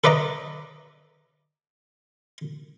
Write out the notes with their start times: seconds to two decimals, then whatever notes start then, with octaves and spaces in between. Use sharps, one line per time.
0.04 A4 B4 D5 D#5 A#5